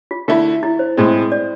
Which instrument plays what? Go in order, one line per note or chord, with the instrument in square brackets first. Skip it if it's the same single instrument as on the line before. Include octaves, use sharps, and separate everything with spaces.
[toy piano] F4
[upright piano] D3 A3 E4 [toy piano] F4
[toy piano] E4
C5
[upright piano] A2 G#3 C4
[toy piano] D5